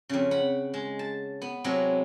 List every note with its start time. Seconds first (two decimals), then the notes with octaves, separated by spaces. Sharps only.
0.09 F2 C#3
0.31 F#5 B5
0.74 G#3
0.99 A5
1.42 B3
1.64 C3 F#3 G#3 A3 E4 D#5